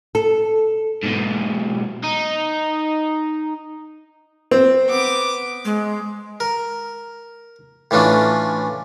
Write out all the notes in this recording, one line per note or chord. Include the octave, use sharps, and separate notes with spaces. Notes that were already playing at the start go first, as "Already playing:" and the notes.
A4
G#2 B2
D#4
C4
B3 D6
G#3
A#4
A2 E3 C#4 D4 F4